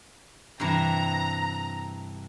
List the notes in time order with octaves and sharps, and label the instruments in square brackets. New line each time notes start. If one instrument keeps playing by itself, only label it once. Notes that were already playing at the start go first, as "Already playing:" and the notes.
[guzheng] G2 C3 E3 [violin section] A#5